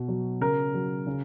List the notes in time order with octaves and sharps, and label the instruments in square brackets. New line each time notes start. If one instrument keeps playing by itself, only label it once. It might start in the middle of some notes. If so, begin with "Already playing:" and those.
Already playing: [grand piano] B2
F#3
C#3 A#4
F#3
C#3